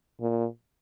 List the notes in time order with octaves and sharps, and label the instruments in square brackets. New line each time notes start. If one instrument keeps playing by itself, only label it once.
[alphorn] A#2